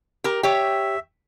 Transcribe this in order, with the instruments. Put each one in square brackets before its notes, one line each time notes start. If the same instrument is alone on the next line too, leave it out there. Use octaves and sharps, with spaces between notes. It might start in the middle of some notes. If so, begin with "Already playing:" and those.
[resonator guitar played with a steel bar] G4 A#4
[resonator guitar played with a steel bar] G4 C#5 [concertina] E5 [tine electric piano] G5